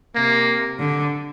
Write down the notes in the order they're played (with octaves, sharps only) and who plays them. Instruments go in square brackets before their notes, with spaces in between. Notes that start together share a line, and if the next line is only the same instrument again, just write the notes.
[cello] C3 [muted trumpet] A#3
[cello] D3